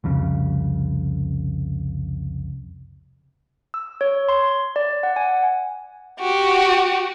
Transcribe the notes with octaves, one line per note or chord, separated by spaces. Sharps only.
C2 F2 C#3
E6
C#5
C6
D5
F#5
G#5
F#4 G4